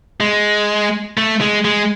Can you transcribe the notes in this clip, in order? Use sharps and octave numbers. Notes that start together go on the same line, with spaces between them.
G#3
A3
G#3
G#3